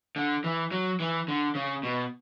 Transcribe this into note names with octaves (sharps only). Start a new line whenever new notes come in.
D3
E3
F#3
E3
D3
C#3
B2